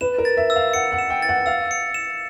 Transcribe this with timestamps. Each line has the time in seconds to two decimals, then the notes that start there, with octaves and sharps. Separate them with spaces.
0.01 B4 E7
0.18 A#4
0.25 A6
0.37 E5
0.50 E6
0.56 F5
0.74 F#5 C#7
0.92 F#5
0.98 E7
1.10 G5
1.22 A6
1.29 F#5
1.46 F5 E6
1.71 C#7
1.94 E7